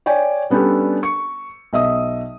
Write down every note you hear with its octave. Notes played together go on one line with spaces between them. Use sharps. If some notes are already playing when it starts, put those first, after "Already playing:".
C#5 D5 G5 G#5
G3 B3 C#4 D4 G4 A4
C#6 C#7
B1 D#5 E5 D#6